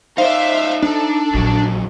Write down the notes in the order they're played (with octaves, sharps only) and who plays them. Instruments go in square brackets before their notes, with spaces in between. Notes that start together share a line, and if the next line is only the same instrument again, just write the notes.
[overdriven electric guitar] D#4 D5 [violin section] C5 E5 [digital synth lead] F5
[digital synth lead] D4 [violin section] A4
[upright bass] A#1 A#2 [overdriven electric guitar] F2 F#3